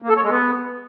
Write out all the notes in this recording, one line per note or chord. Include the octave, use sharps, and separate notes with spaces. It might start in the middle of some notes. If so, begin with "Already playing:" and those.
A#3
A4
C#5
G#3
B3